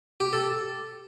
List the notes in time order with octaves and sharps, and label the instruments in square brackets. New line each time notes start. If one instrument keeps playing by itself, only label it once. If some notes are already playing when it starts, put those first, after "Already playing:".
[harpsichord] G4
A4